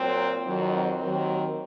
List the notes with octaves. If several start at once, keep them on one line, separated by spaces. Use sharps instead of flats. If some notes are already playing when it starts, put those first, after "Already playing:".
Already playing: A#2 F#3 C4
F2 D#3 F#3
C4
D#2 D#3 F#3